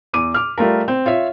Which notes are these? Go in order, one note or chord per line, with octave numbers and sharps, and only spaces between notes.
E2 D6 D#7
D6 F6
G3 A3 F4 A#4
C4
F4 C#5 E5